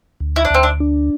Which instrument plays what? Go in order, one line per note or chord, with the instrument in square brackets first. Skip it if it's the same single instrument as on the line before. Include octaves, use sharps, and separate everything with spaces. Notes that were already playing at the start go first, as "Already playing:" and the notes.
[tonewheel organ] D2
[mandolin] E4
D4
[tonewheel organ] D2 [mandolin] C4
[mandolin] D4
[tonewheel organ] D4